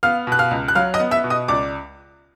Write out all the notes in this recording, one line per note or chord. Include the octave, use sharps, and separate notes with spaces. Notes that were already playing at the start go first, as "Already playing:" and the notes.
B3 F5 F6
B2 F#6
F5 F6
C#2
F#6
F#3 F5 F6
D#5 D#6
B3
E5 E6
B2
D#5 D#6
C#2 D5 D6